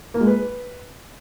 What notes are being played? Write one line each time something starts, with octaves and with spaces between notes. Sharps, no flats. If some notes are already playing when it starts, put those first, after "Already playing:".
A#3
G#3
B4